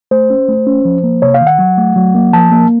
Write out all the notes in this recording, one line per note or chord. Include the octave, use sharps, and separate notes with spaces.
A3 C5
C#4
A3
C#4
F3
A#3
C3 C#5
F5
D#3
F#5
F#3
A3
F#3
A#3
F3 A5
A#3